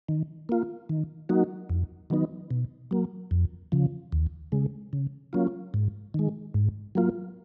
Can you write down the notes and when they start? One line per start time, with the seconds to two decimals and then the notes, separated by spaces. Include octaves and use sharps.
0.09 D#3
0.49 A#3 F4
0.89 D#3
1.29 F#3 A#3 D#4 F#4
1.70 F2
2.10 D#3 F#3 B3 D#4
2.51 B2
2.91 F#3 A#3
3.31 F2
3.72 C#3 F3
4.12 D#2
4.52 C#3 G#3
4.93 C#3
5.33 F#3 A#3 C#4 F4
5.74 G#2
6.14 D#3 G#3
6.54 G#2
6.95 F#3 A#3 F4